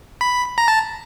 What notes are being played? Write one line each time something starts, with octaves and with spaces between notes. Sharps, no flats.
B5
A#5
A5